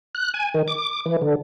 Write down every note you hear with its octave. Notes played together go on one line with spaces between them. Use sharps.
F#6
G#5
D#3
D6
E3
D3